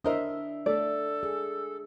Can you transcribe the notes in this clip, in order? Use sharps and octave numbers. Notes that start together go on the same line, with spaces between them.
D4 A#4 C5 D#5 E5
A3 A4 D5
G#4